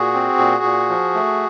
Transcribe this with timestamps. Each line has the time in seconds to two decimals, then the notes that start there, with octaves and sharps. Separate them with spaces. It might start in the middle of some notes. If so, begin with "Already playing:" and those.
Already playing: A#2 F#4 G#4
0.14 C4
0.38 A#2
0.64 A#2
0.89 F3
1.15 A3